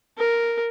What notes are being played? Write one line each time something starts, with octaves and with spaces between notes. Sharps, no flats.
A#4